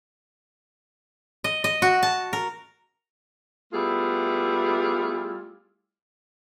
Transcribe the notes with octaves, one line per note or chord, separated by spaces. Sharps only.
D#5
D#5
F#4
A5
A#4
G3 A3 B3 E4 F4 G#4